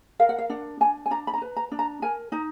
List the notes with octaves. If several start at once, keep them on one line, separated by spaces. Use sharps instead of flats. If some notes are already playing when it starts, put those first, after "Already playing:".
A#4 F5
F#5
F5
D4 F#5
D4 G#5
G#5
D4 A#5
B5
A#5
B4
A#5
D4
A#5
A#4 G#5
D#4 A#5